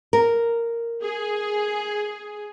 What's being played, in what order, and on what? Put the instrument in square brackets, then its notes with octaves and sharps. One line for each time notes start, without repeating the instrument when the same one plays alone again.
[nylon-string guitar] A#4
[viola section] G#4